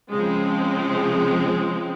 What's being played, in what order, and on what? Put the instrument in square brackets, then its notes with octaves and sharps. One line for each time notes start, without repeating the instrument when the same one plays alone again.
[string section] C#3 F3 G#3 C4